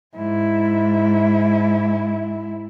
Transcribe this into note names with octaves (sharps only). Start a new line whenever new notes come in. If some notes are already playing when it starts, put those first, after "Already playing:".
G#2 E4